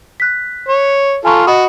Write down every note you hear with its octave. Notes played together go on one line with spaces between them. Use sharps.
F#6 B6
C#5
F4 A4 G#5 A#5 C#6
F#4 D#5 B5 D#6